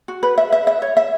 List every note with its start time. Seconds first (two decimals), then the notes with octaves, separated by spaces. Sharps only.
0.08 F#4
0.23 B4
0.38 E5
0.52 E5
0.67 E5
0.82 C#5
0.97 E5